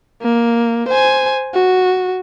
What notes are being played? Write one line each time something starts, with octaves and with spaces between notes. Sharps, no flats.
A#3
C5 G#5
F#4